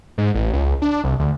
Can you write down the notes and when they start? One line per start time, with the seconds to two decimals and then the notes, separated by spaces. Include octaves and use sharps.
0.18 G#2
0.34 A1
0.53 C#2
0.82 D4
1.04 C2
1.19 D2